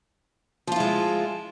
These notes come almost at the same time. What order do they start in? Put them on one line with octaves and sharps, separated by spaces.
F3 F4 E4 G#3